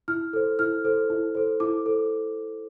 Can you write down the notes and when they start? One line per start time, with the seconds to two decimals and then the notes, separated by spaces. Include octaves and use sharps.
0.08 E4 F6
0.33 A4 C5
0.59 E4 F6
0.84 A4 C5
1.10 E4
1.35 A4 C5
1.60 E4 D6
1.86 A4 C5